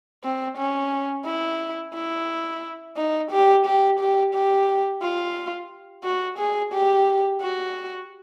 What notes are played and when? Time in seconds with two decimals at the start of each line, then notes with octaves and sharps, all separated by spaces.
0.24 C4
0.57 C#4
1.25 E4
1.94 E4
2.97 D#4
3.31 G4
3.66 G4
3.99 G4
4.34 G4
5.02 F4
6.04 F#4
6.38 G#4
6.72 G4
7.41 F#4